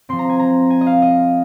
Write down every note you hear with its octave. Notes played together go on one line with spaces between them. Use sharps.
F3 C4 C6
A#5
G#5
A#5
G#5
D#5
F5
D#5